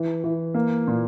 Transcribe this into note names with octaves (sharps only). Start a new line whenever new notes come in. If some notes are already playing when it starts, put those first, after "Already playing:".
Already playing: E3
E3
A#3
A#2